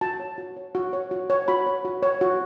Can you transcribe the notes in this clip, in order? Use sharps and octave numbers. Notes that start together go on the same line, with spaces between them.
F#4 A5
C#5
F#4
C#5
F#4
C#5
F#4
C#5
F#4 B5
C#5
F#4
C#5
F#4